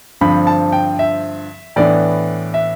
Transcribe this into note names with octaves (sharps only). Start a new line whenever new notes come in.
G2 D3 F3 C4 B5
A5
G5
E5
A2 E3 B3 D4 D5
E5